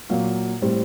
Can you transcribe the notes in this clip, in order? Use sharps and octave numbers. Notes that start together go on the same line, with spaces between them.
A#2 F#3 A#3
A2 G3 C4